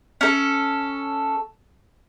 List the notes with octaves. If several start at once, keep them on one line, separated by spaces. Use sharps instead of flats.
C#4 A4